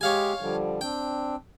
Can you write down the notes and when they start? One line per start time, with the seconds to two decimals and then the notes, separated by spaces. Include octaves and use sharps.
0.01 G#3 G4 G#4 C#5 F5 G#5
0.41 D3 F3 G3
0.81 C4 D4 G5